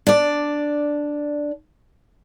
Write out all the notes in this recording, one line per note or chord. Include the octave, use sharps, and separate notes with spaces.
D4 D5